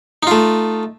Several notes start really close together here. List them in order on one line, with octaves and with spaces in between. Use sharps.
D#4 F4 A3